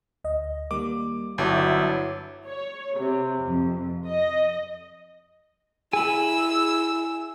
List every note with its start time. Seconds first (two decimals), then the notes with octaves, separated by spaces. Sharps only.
0.24 D2 D#5
0.71 D#3 G3 A#3 D6
1.38 G1 F#3 D4 E4 A5
2.47 C#5
2.99 C3
3.43 F2
4.08 D#5
5.93 E4 G#4 G#5 B5 E6